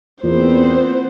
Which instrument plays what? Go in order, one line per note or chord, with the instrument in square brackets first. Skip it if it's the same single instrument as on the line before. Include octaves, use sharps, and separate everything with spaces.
[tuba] E2 [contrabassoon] A#2 [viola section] B3 C4 [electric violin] C5